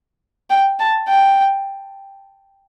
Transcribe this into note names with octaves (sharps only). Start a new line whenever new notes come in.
G5
A5
G5